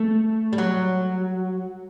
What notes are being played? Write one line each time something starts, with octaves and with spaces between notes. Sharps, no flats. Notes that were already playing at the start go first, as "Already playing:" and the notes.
Already playing: A3
G3
F#3